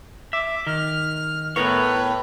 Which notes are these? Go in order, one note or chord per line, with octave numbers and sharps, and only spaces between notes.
E5 D6
D#3 F6
A2 B3 A#4 B4 C#5